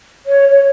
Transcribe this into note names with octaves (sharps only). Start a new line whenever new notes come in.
C#5
C#5